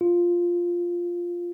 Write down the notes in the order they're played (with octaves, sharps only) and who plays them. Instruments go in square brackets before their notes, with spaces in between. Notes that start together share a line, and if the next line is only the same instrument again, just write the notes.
[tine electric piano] F4